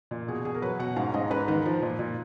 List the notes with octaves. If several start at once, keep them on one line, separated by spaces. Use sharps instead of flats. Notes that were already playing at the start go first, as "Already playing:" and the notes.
A#2
B2 G#4
B2 G#4
A#4
F#3 B4
B2 F#5
G#2 F5
G#2 D#5
G#2 B4
D#3 B4
F3
A#2
A#2